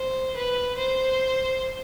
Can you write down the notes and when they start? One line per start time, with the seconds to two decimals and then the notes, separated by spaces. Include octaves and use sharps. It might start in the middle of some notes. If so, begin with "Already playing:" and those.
Already playing: C5
0.36 B4
0.77 C5